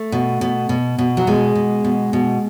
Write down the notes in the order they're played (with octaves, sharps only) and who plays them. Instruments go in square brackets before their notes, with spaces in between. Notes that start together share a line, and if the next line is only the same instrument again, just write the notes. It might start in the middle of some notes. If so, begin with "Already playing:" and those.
Already playing: [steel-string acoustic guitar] A3
B2
B2
B2
B2
F#3
B2 G#3
B2
B2
B2